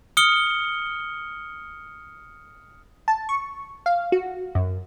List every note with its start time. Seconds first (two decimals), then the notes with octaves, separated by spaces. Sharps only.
0.17 D#6 F6 C#7 G7
3.08 A5
3.29 C#6
3.86 F5
4.12 F#4
4.55 F#2